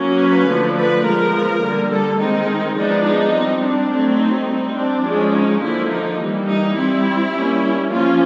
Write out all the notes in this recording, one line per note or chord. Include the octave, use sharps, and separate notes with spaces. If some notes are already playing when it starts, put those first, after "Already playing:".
Already playing: F#3 A#3 C#4
B4
D3 F3 A3 D4
B4
F3 G#3 B3 A#4
D3 G3 A#3
A4
D#3 G#3 C4 D#4
F3 G#3 B3 D4 D#4
D#4
G3 C4
D4
F#3 A3 C4
D#4
G3 C4
D4
F3 G#3 C#4
D#4
D3 F3 A#3 E4
D#4
E3 G3 A#3
D#4
G3 C4 E4
G3 A#3 C#4
F3 A#3 C#4 F4